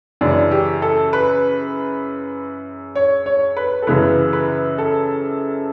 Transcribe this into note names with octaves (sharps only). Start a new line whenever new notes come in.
F#2 C#3 E3 D4
G4
A4
B4
C#5
C#5
B4
A4
F#2 C#3 E3 B4
B4
A4